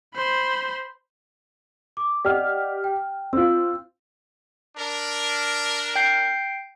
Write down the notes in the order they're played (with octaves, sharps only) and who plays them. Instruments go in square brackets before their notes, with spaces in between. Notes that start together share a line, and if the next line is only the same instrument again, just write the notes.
[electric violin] C5 B5
[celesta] D6
[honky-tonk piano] G4 F6 [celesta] D5 D#5 F#5
[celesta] G5
[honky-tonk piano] C4 F4 [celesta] E6
[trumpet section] D4 A#4
[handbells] G5 G6 C7